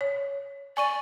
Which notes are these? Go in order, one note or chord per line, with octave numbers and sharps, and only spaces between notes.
C#5
D5 G#5 C#6 D#7